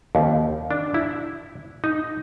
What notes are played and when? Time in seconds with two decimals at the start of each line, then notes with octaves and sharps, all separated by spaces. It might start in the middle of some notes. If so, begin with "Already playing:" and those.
0.15 D#2
0.71 D4
0.94 E4
1.84 D#4